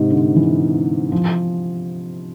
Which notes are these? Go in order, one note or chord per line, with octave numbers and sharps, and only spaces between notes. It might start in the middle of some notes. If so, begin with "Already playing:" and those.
Already playing: G#2 C3
D3
E3
F3